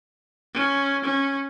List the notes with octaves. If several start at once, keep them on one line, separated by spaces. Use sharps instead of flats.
C#4
C#4